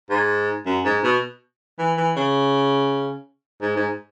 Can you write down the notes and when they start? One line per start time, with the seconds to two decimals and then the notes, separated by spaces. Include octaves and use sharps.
0.10 G#2
0.66 F#2
0.85 G#2
1.04 B2
1.79 E3
1.97 E3
2.16 C#3
3.62 G#2
3.76 G#2